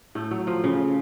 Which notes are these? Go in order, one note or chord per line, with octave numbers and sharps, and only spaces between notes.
A2 A3
F#3
F3
C#3